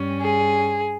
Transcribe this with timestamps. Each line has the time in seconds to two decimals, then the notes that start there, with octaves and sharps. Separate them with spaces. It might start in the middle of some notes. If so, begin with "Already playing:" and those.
Already playing: G2 G3 C#4
0.21 G#4